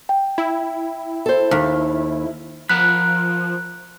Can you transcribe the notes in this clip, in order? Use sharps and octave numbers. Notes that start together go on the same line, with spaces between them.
G5
E4
A4 C5
D#2
F3 A#4 F#5 B5 F#6